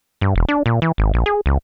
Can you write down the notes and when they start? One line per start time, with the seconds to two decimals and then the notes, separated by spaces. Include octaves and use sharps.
0.21 G2
0.36 E1
0.49 D4
0.66 A#2
0.82 E3
0.98 G#1
1.14 A#1
1.26 G#4
1.46 C#2